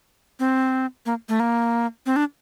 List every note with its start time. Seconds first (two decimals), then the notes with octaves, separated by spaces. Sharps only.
0.39 C4
1.06 A#3
1.29 A3
1.40 A#3
2.06 C4
2.16 D4